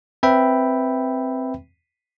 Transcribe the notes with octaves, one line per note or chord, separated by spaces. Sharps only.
C4 B4 E5 G5 B5